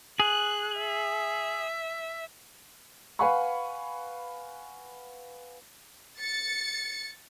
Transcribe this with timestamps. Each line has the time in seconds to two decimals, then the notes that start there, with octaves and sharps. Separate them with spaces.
0.20 G#4 F#6
0.79 E5
3.19 B4 F5 F#5 G#5 B5 C#6
6.20 A6 C#7